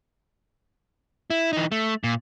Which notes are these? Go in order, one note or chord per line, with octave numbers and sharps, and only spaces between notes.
E4
E3 D#4
A3
A#2